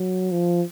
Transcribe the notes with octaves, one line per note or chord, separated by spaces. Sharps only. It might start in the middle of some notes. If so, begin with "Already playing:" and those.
Already playing: F#3
F3